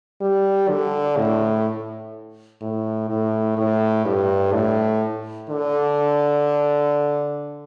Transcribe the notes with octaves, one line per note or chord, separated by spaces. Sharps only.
G3
D3
A2
A2
A2
A2
G2
A2
D3